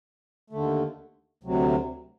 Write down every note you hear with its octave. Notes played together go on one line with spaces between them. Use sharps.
D#2 D3 A3
D2 C3 F#3